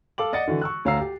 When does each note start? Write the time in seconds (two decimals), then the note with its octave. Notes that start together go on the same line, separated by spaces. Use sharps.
0.18 A4 F5 D6 F#7
0.33 D5 D#5 F#5 A6 C#7
0.47 D3 E3 F#4
0.61 C#6 E6 F#6
0.85 D2 C#5 F5 A#5 E6 C7
1.00 G4